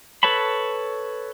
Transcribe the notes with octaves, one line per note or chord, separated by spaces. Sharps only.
A4 B4 C#5 A5 B5